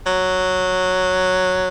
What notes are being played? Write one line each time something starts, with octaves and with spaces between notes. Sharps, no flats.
F#3